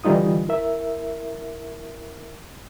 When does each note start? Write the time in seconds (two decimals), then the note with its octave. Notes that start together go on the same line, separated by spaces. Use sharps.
0.04 D3 E3 G3 D#4 F4 D#6
0.48 E4 A#4 E5